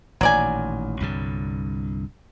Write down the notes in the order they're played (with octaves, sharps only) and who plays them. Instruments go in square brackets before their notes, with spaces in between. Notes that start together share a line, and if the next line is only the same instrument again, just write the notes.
[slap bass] A1 A#2 D#3 [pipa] F#3 D5 G#5
[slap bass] C2 G2 D3